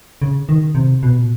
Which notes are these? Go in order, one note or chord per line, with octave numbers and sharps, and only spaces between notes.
C#3
D#3
C3
B2
A#2